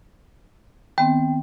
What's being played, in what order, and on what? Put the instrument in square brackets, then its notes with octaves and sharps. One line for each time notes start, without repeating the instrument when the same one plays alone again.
[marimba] D#3 B3 C4 [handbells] G5